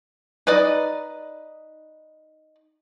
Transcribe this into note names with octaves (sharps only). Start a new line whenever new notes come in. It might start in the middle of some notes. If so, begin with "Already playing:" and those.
D#4 B4 D5 D#5